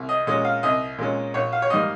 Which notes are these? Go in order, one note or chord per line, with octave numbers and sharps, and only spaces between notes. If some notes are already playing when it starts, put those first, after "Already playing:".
Already playing: C2
D#5
A#2 G#3 C#4 D#5
F5
C2 D#5
A#2 G#3 C#4
A#1 C#5
F5
C#5
G#2 G3 A#3 D#5